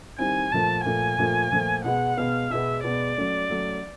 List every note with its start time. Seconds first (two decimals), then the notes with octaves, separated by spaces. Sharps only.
0.18 D#3 G3 C4 E4 G#5
0.52 A#2 F3 A3 A5
0.85 A#2 F3 A3 G#5
1.18 A#2 F3 A3
1.51 A#2 F3 A3
1.84 B2 G#3 B3 F#5
2.17 B2 G#3 B3 F5
2.50 B2 G#3 B3 E5
2.83 B2 G#3 B3 D5
3.18 F#3 A3 C#4
3.50 F#3 A3 C#4